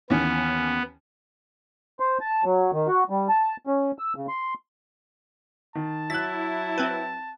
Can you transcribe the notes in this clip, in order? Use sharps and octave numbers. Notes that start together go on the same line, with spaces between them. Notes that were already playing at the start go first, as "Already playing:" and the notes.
D#2 E3 B3 C#4
C5
A5
F#3
D#3
F#4
G3
A5
C#4
E6
C#3
C6
D#3 A5
F#3 E4 F#6 A6 B6
C4 B4